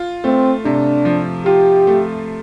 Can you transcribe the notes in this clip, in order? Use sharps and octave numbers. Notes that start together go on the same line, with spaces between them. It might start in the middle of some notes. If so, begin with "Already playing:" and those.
Already playing: F4
A3 C4
C3 D4
F3
F4 G4
A3